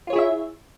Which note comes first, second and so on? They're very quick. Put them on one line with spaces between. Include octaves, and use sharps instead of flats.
F4 C#5 G#4 E4 E5